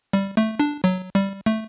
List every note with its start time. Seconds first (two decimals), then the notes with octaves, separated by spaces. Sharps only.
0.13 G3
0.37 A3
0.60 D4
0.84 F#3
1.15 G3
1.46 A3